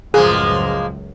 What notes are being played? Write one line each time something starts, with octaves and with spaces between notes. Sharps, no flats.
C#2 F#2 A2 F3 G#3 A#3 G#4